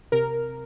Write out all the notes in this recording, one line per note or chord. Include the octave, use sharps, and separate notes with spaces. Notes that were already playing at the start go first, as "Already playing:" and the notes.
C3 A#4